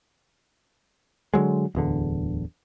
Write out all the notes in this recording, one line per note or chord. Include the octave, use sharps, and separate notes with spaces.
D3 E3 F#3 G#3
D1 E2 D3